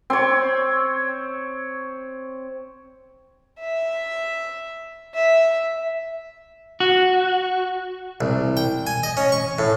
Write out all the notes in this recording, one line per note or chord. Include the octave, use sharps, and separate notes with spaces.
C4 C#5
E5
E5
F#4
C2
G5
G#5
D#5
C#4
C#6
A2